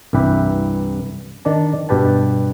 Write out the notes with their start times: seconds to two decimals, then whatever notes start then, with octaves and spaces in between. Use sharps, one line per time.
0.13 C2 G2 E3 G4 B4 E5
1.45 D#3 D4 D5 A5
1.89 G2 B2 G4 B4 A5